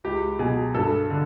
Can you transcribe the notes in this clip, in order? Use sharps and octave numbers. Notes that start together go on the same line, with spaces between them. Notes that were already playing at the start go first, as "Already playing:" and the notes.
C#2 G4
B2 F#3 G#4
G2 A4
D3